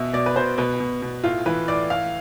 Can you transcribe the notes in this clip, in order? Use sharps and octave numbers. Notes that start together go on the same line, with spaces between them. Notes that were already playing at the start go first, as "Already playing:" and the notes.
Already playing: B2 E5
B2 D5
B4
B2 C5
B2 B4
B2
B2
A2 F4
E3 B4
A2 D5
A2 F5